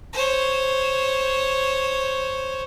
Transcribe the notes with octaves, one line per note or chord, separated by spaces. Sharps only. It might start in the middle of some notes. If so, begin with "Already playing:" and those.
C5 C#5